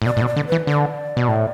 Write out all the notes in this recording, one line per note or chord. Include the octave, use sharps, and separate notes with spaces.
A2
B2 D5
A2
B2
D5
D3
E3 B4
D3 D5
B2
A2